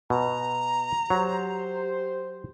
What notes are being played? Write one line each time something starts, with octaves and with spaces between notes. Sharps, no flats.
B2 A#5
F#3 G4 C5